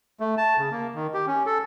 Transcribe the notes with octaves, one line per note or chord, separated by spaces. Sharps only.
A3
A5
C#3
A#3
D#3
G4
C#4
A4